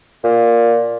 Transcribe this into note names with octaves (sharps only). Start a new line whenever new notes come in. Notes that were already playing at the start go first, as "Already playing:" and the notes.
A#2